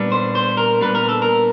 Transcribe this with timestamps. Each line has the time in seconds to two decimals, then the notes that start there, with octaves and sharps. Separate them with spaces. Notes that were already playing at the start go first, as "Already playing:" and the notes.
Already playing: A#2 G3 B3 D4
0.12 C5
0.35 C5
0.57 A#4
0.81 A#2 G3 B3 D4 B4
0.95 A#4
1.09 A4
1.22 A#4